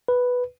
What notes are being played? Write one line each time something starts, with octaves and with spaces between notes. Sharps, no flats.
B4